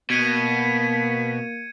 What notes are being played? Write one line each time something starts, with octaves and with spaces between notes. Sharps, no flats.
B2 A#3 G#6 B6 C#7 D#7